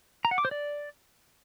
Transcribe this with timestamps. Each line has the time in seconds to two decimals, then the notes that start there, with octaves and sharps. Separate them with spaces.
0.25 A#5
0.31 F#5
0.38 D6
0.45 C5
0.51 D5